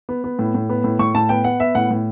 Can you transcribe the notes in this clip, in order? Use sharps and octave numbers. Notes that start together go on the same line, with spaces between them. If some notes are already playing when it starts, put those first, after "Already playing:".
B3
B3
A2
A2
B3
A2
A2 C#6
A2 A5
B3 G5
B3 F#5
B3 E5
A2 F#5
A2